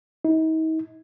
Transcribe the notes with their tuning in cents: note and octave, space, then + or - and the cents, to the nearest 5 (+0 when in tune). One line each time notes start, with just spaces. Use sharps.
D#4 +40